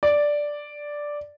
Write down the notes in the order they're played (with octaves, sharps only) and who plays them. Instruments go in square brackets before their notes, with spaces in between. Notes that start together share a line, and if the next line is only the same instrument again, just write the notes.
[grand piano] D5